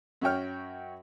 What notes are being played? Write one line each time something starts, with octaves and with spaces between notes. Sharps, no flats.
F#2 F#4 C#5 G5 F6